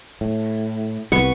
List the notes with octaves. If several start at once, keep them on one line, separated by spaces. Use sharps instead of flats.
A2
C2 B3 C#6